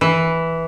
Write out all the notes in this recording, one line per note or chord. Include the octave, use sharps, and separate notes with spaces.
E3